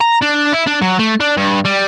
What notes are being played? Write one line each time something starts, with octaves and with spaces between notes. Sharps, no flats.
A#5
D4
E4
D4
F#3
A3
D4
G2
G3